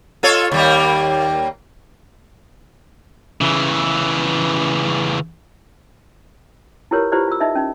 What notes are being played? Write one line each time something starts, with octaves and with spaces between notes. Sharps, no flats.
F4 A4 C#5
D#2 G3 A#3
C#3 E3
E4 F4 G4 A#4 B4 C#5
E4 F4 G4 B4 C5 D5
F4 E6
D#4 D#5 E5
C#4 D#4